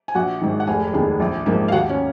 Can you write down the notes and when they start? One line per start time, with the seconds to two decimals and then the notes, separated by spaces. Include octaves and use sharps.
0.08 G#5
0.15 A#1 F#4 F#5
0.41 G#2 D#3
0.60 F#5
0.67 F1 G#4 G#5
0.93 D#2 D#3 G#3 B3
1.20 A#1
1.46 G#2 F3 A#3
1.68 F5
1.72 D#2 F#4 F#5
1.89 C#4 C#5